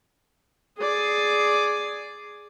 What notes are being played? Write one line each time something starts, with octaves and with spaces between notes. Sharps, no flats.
G#4 D5